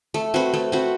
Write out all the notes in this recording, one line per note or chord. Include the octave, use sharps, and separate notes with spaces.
A3
C4 F#4 B4
A3
C4 F#4 B4